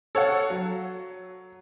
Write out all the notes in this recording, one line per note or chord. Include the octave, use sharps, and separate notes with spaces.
A4 C#5 F5 F#5
F#3